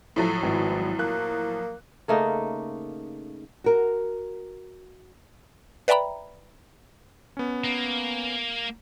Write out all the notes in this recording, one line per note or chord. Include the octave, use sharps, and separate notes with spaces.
A2 F3 F#3 A3
G#1 E3
A#3 F#6
C#3 A3 A#3 D#4
F#4 A#4
B4 D5 E5 G5 A#5 B5
B3 C#4
A#3